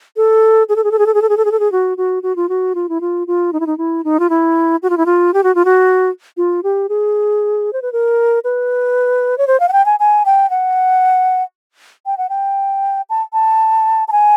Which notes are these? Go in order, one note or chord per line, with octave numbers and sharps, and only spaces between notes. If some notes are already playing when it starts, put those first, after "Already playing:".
A4
G#4
A4
G#4
A4
G#4
A4
G#4
A4
G#4
A4
G#4
A4
G#4
F#4
F#4
F#4
F4
F#4
F4
E4
F4
F4
D#4
E4
D#4
E4
D#4
F4
E4
F#4
F4
E4
F4
G4
F#4
F4
F#4
F4
G4
G#4
C5
B4
A#4
B4
C#5
C5
F5
F#5
G5
G#5
G#5
G5
F#5
G5
F#5
G5
A5
A5
A5
G#5